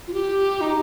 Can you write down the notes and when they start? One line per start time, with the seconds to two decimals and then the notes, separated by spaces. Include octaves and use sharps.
0.07 F4
0.13 G4
0.61 D#4